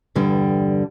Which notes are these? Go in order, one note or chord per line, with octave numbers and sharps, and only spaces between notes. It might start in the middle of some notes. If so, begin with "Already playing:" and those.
E2 G2 D3 G3